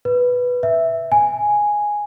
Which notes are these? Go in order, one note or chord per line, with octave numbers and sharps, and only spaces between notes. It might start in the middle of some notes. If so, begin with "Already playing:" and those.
B4
E5
G#5